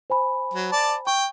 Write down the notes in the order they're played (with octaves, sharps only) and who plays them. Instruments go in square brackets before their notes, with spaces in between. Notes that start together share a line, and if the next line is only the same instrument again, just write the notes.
[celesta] C5 G#5 B5
[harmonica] F#3
D5 A5
[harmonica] G5 [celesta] C#6